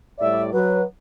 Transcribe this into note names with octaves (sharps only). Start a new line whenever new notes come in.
A2 G3 D5 E5
F#3 B4